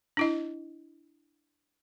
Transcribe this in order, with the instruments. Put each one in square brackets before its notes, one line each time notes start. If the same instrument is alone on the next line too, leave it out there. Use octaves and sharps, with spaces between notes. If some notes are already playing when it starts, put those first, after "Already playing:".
[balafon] D4 E4 D#5